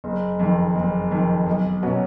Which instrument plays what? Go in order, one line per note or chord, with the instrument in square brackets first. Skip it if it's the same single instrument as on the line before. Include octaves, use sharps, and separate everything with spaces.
[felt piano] F#1
F2 D#3
F#1
F2 D#3
B1
B2 F#3 C#4 F#4